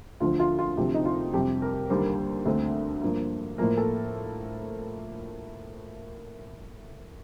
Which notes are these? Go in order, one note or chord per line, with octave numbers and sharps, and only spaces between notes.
D2 D3 F3 F4
F4
F4
D2 C3 F3 C4 G4
D#4
F4
F2 C3 G3 G4
A#4
D#2 D3 G3 A#3 C5
D2 D3 A3 C4
G2 F3 A#3
A2 F3 A#3 A#4
A4